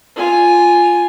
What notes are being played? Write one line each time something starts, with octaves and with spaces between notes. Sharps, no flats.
F4 G#5